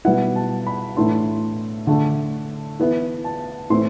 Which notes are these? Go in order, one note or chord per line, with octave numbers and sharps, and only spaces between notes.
B2 G3 B3 E4 F#5
A5
B5
A2 E3 A3 D4 C6
D3 A3 D4
E3 B3 E4
A5
A2 E3 A3 C4 C6